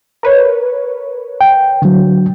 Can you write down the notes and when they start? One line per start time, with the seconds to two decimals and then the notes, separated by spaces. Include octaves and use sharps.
0.23 A#4 B4 C#5
1.41 G5
1.82 D3 F#3